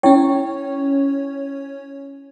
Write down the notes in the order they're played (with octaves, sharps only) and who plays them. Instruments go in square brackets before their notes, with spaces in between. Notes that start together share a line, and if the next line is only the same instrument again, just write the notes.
[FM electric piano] C#4 C#5 [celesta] E4 G5